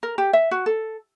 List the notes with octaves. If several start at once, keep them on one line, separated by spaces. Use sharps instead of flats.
A#4
G4
E5
F#4
A4